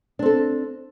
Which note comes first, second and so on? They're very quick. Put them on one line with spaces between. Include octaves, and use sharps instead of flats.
D4 C4 A4